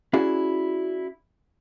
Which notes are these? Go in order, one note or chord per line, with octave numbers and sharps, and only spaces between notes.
C#4 E4 F#4 G#4 D5